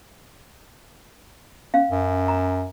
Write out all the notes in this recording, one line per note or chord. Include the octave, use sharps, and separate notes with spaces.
C#4 F5
F#2
A#5